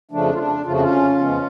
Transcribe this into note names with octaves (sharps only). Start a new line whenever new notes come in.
F2 C#3 F3 A3 D4
F4
D4
F2 C#3 F3 A3 F4
F#4
C#4 F4
F2 C#3 F3 G#3 B3